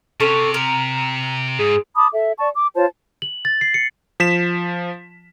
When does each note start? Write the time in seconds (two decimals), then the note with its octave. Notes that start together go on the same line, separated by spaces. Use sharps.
0.20 C3 C#4 A4 C#5
0.54 A#4
1.59 G#2 G#4
1.96 A5 B5 D6 D#6
2.12 A4 E5
2.39 D5 A5 C#6
2.54 D6
2.76 F4 C5 C#5 A5
3.22 F#7
3.45 A6
3.61 C7
3.74 C#7
4.20 F3 B6 E7